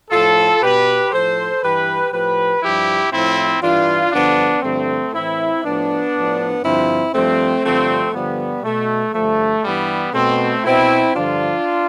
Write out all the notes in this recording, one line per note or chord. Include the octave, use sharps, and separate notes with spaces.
A2 F3 F4 A4
B2 G4 B4
A2 F3 A4 C5
G2 E3 G4 B4
A2 F3 G4 B4
G2 F3 E4 G4
A2 F3 C4 E4
G2 E3 D4 F4
G2 D3 F3 B3 D4
G2 D3 F3 A3 C4
A2 E3 C4 E4
A2 F3 B3 D4
A2 F3
G2 D3 F3 C4 E4
G2 F3 A3 C4
G2 D3 F3 A3 C4
G2 D3 F3 G3 B3
B2 A3
G2 D3 F3 A3
G2 E3 G3 B3
B2 A3 C4
B2 C4 E4
G2 D3 F3 D4 F4